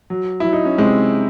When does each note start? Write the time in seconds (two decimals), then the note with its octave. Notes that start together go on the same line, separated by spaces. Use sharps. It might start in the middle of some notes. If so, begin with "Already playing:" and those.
0.10 F#3
0.40 F#3 E4
0.53 D#4
0.65 C#4
0.78 C3 G#3 C4